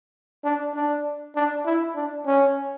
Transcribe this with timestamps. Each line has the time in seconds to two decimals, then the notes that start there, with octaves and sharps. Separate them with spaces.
0.44 D4
0.74 D4
1.36 D4
1.65 E4
1.95 D4
2.27 C#4